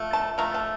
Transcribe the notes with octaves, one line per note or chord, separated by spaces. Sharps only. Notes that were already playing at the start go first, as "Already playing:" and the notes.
Already playing: F3 A3
A5
F3 A3 A#5
A5